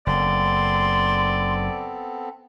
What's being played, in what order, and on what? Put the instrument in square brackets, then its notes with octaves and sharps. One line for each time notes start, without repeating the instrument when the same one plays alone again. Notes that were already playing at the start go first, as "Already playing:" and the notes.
[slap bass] F#1 [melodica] B3 C4 A4 [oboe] D5 [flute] C6